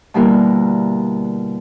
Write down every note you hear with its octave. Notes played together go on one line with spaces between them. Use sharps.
B2 D3 G3 A#3 E4 A#4